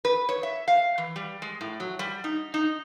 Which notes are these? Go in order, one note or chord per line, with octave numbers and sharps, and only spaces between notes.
B4
C#5
E5
F5
E3
G3
G#3
A2
F#3
G3
D#4
D#4